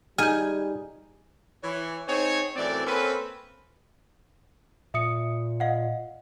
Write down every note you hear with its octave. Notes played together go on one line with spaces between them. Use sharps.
G3 D#4 G#4 G#5 F6 G6
E3 C#5
C4 D#4 G#4 C5 C#5
F#2 A2 E3 C4 D5
A#3 C4 C#4 A4 B4
A#2 E5 D#6 C#7
D#5 F5 F#5